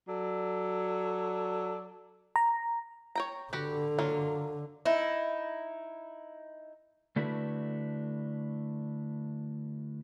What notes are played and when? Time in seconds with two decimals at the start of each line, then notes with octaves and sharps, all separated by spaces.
0.07 F#3 A4 D5
2.36 A#5
3.15 C#5 G5 A#5
3.53 D3 F#4 G4 B4
3.99 F#3 A#3 F4
4.86 D#4 E4
7.16 D3 A3 D4 E4 F#4 B4